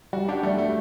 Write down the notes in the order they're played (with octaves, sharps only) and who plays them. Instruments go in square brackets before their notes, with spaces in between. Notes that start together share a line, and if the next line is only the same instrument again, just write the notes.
[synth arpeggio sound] G3 [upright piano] F#4
[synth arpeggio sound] D4 [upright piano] G4
[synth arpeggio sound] G3 [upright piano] A3
[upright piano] A3